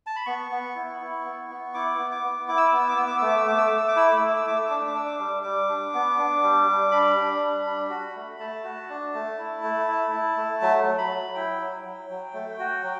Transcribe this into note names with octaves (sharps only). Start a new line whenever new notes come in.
A5
B5
B3 C#6
B3
E4
E4
B3
B3
E4 D6
B3
D6
B3
E4 D6
E6
B3 D6
E6
D6
B3 E6
D6
A3 E6
D6
E6
A3 D6
E6
A3 D6
E6
D6
E4 E6
D6
A3 E6
D6
E6
A3 D6
E6
D4 D6
E6
D6
D4 E6
D6
G3
G3 D6
D4
B3
D4
G3
G3
D4 B5
D4
G3
D4
F#4
A3
A3 A5
F#4
D4
A3
E4
A3
E4
E4
A3
F#3
F#3
B5
F#3
E4 G5
F#3
F#3
F#3
A3
F#4
F#3